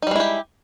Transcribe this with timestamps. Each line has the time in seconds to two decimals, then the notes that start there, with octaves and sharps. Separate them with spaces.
0.02 D#4
0.07 G3
0.11 G#3
0.16 E4
0.20 G4